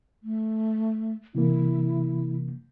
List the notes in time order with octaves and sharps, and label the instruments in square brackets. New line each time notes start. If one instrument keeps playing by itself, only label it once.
[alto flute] A3
[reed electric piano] C3 E3 A#3 [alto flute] E4